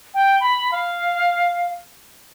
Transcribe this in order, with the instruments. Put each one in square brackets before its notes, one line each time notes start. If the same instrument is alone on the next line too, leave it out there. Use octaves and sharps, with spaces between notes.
[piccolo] G5
B5
F5